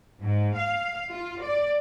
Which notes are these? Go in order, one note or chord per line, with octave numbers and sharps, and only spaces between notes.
G#2
F5
F4
D5